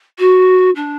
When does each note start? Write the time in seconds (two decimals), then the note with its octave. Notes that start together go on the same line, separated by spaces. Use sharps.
0.19 F#4
0.76 D4